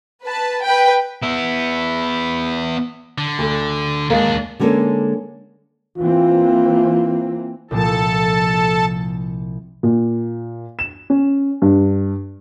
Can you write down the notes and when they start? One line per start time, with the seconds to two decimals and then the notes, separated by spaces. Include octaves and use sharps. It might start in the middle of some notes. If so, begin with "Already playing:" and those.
0.22 B4 A5
0.62 B4 G5
1.22 B3 E4
3.18 D3
3.38 D2
4.10 D#2 G#3 A#3 D4
4.60 D3 G#3 A#3 C#4 A4
5.98 E3 A#3 C4 F4
7.71 C2 A#2 F3 A4 A5
9.83 A#2
10.79 E7
11.10 C#4
11.62 G2